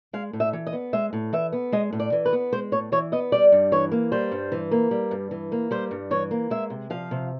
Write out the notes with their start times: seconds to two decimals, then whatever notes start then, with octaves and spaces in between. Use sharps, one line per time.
0.13 G#3 F5
0.33 A2
0.40 E5
0.53 E3
0.67 D#5
0.73 B3
0.93 G#3 E5
1.13 A2
1.33 E3 E5
1.53 B3
1.72 G#3 D#5
1.93 A2
2.00 D5
2.12 E3
2.25 B4
2.33 B3
2.52 G#3 C5
2.72 A2 C#5
2.92 E3 C#5
3.12 B3 D#5
3.32 G3 D5
3.52 G2
3.72 E3 C#5
3.91 A#3
4.12 G3 C5
4.32 G2
4.52 E3
4.71 A#3
4.91 G3
5.11 G2
5.31 E3
5.52 A#3
5.71 G3 C5
5.91 G2
6.11 E3 C#5
6.31 A#3
6.50 G#3 E5
6.70 C3
6.90 F3 F5
7.11 C3